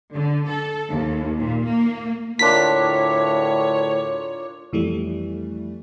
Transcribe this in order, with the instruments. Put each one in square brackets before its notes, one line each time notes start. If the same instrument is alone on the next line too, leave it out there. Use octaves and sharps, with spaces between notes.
[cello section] D3
A4
D#2
A#2
A#3
[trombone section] D2 A2 [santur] D4 F4 A#4 [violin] C#5 [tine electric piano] B6
[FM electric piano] F2 E3 G3 A3